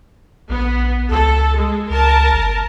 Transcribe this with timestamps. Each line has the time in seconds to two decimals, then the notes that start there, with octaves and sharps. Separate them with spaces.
0.49 A#1 B3
1.10 C#2 A4
1.58 G#3
1.90 C#2 A#4 A5
2.32 G1